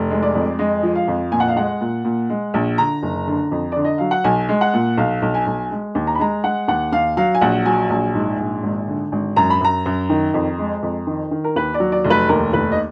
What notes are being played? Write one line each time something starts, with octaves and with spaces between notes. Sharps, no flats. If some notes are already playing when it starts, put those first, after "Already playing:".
Already playing: F1
G#3
D5
F2
G#3 D#5
F3
F5
F2
A#2 G#5
F#5
F5
G#3 F#5
A#2
A#2
G#3
A#1
D3 A#5
F#1
D3
F2
D3 D5
D#5
F#3 F5
F#5
B1 G#5
G#3
F#5
A#2
B1 F5
B1
G#5
B1
G#3
D#2
A#5
B5
G#3 A#5
G#3 F#5
D#2 F#5
D#2 F5
F#3 F5
G#5
A#1 F#5
F#3 G#5
A#1
G#2
A#1
G#1
D3
G#1
F#2 A#5
B5
F#2 A#5
F#2
D#3
F2
G#3
F2
D#3
D#3
A#4
D#2 B4
D5
F#3
D5
F1
B4
D#2 A#4
F1 B4
D#5